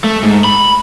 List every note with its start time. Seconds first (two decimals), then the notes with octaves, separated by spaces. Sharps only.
0.04 A3
0.23 G#2
0.44 B5